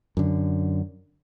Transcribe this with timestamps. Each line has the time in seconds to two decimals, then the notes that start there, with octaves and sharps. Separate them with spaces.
0.17 F#2 D3